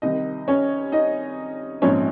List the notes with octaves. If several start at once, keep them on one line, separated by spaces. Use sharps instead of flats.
C2 C3 D#3 D#4 D#5
C#4 C#5
D#4 D#5
A#1 G#2 F3 C4 C#4 C#5